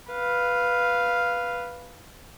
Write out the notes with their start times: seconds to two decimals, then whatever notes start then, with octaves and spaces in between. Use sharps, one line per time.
0.11 B4 F5